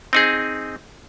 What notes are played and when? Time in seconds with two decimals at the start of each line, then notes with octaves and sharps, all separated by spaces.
0.13 C4 D#4 G#4